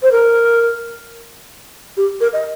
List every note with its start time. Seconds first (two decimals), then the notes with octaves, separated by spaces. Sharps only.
0.02 C5
0.11 A#4
1.97 G4
2.20 A#4
2.33 D#5